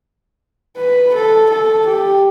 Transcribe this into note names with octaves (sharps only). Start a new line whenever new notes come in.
B4
A4
A4
G4